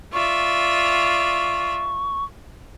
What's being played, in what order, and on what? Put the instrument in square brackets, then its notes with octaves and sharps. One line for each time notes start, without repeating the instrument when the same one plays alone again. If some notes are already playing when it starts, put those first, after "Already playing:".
[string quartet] F4 D5 E5 [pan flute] C#6